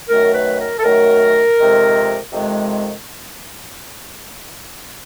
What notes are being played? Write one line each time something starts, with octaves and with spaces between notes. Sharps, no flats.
F#2 D#3 F#3 A3 A#4
B4
A#4
A4
F#2 D#3 F#3 A3 A#4
F2 C3 D#3 G#3
F2 C3 D#3 G#3